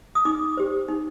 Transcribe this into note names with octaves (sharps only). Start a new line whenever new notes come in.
D#6
D#4 D6
G4 C5
D#4